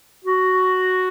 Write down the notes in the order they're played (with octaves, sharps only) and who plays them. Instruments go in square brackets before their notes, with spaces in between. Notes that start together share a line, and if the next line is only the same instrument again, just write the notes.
[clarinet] F#4